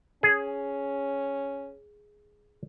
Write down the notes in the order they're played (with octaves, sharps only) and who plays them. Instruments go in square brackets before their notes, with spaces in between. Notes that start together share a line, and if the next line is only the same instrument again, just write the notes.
[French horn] C#4 [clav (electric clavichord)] G#4